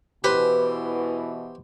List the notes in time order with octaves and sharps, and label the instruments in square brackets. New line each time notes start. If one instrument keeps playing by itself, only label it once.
[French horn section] B2 E3 [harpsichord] G4 C5 [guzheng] B4